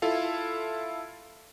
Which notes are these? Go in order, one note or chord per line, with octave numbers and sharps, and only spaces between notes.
E4 F4 A4 F5